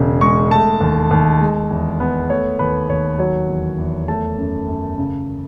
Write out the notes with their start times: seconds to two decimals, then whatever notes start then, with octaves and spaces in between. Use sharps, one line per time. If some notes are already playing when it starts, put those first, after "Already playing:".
Already playing: E1 C#3
0.21 G#3 C#6
0.51 A3 A5
0.81 D#2
1.11 D#2
1.41 G#3
1.70 E2
2.00 B3
2.30 A3 C#5
2.59 D#2 B4
2.89 D#2 C#5
3.19 F#3 C#5
3.49 E2
3.78 E2
4.08 A3 A5
4.38 F#2
4.68 F#2
4.98 C#3